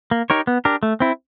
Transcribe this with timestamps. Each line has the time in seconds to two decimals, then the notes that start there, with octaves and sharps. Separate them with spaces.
0.11 A#3
0.30 D#4 G4 A#4 C#5
0.47 B3
0.65 D4 G4 A#4
0.83 A3
1.00 C4 E4